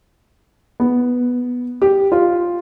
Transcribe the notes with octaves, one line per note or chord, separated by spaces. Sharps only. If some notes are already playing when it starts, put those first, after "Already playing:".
B3
G4
F4